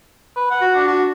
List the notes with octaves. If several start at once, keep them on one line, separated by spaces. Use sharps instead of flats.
B4
F#5
F#4
D4
F#4